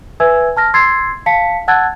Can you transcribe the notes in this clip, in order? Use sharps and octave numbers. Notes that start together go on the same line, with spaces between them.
B4 E5 G#5 E6 G#6
A5 F6 A#6
C6 E6 G#6 A6 C7
F5 A5 B6 C#7
F#5 A5 E6 F#6 G#6 A6